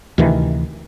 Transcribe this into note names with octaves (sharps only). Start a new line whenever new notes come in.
D2 C3 D#3 E3